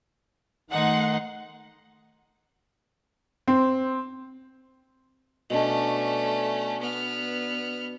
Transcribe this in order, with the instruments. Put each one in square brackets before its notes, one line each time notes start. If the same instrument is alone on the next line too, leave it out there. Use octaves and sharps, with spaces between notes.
[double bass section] D#3 A3 [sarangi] D#4 [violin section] F#5 C6
[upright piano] C4
[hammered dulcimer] B2 D4 [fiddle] A3 C#4
[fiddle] B3 F6